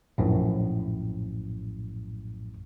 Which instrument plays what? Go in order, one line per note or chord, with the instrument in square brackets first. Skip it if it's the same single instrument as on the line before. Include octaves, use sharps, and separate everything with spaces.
[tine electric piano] A#1 F#2 A2